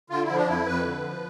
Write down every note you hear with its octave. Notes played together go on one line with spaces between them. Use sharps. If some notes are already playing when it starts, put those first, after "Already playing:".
D3 F4
E4
F3
D4
F2 E4
F2 B4
D3
F3